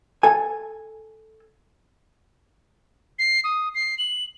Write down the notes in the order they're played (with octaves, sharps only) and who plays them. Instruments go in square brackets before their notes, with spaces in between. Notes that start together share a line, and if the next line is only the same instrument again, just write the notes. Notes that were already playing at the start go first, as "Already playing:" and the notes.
[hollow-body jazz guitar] A4 G#5
[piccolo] C7
D#6
C7
F#7